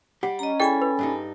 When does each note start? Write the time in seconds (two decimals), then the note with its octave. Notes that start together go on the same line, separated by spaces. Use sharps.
0.23 G3 G4 F#5
0.39 C#4 D#5 A#5
0.60 E4 G#4 A4 D5 G5 G#5 B5
0.81 B4
0.99 G2 D4 D#4